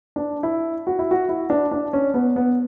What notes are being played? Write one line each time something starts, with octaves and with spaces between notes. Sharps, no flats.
D4
E4
F#4
E4
F#4
E4
D4
D4
C#4
B3
B3